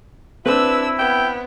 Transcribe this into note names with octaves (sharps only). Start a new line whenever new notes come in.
C4 D4 E4 B4 E6
B3 G5